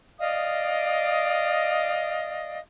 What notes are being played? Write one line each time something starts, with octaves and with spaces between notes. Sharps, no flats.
D5 D#5 F5 D#6